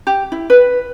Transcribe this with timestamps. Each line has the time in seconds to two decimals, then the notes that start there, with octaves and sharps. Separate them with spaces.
0.07 G4
0.32 E4
0.50 B4